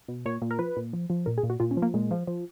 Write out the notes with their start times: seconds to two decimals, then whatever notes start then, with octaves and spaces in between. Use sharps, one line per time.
0.08 B2
0.26 A#2 C#5
0.42 A#2
0.51 A#4
0.59 F3 B4
0.77 A#2
0.93 F3
1.10 F3
1.26 A#2 A#4
1.38 G#4
1.43 A#2
1.50 F#4
1.60 A#2 F4
1.71 C#4
1.77 F3
1.82 A#3
1.94 A#2 G#3
2.11 F3
2.27 F3